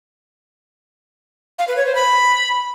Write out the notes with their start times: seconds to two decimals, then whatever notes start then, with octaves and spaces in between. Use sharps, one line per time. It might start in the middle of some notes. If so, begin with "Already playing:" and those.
1.59 F5
1.68 B4
1.77 C#5
1.86 C5
1.95 B5